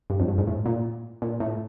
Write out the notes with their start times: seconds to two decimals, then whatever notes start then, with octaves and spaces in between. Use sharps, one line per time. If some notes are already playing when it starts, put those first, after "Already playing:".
0.10 G2
0.20 F2
0.28 G2
0.38 G#2
0.47 A2
0.66 A#2
1.22 A#2
1.40 A2